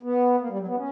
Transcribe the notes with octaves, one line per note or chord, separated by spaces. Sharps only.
B3
A#3
G3
F#3
B3
C#4